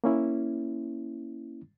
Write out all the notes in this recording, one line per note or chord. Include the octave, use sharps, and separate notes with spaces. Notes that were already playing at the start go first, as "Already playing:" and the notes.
A#3 C#4 E4